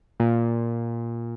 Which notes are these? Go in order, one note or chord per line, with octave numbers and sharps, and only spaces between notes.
A#2